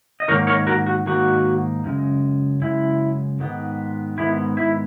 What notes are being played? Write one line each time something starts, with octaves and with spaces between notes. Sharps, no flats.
D#5
G#2 D#3 A#3 D#4 A#4 C#5
A#4 C#5
F#4 A#4
F#4
G#2 D#3 A#3 D#4 F#4
F#2 C#3 G#3
F#2 C#3 G#3 E4
G#2 D#3 G#3 B3
G#2 D#3 G#3 B3 E4
E4